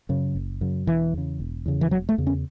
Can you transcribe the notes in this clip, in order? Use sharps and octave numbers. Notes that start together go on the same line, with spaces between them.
F#2 C#3
F#1
F#2 C#3
E1 E3
E2 C#3
E1
E2 C#3
E3
E1 F#3
A3
E2 C#3
C#4